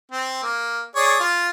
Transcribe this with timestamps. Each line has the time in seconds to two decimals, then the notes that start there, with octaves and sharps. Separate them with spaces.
0.11 C4
0.43 A#3
0.95 G#4 C#5 D5
1.19 F4